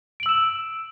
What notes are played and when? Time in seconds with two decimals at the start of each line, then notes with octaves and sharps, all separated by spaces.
0.20 D7
0.23 F#7
0.26 E6
0.29 E7